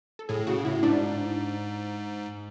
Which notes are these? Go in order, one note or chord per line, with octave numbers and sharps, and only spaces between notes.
A4
A2 G#4
C#3 F#4
A2 E4
G#2 D4